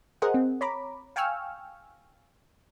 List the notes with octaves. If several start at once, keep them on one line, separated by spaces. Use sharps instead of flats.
G#4 A#4 C5 D#5 F#5
C4
C#5 A#5 B5 D6
F5 G5 G#5 C#6 E6 F6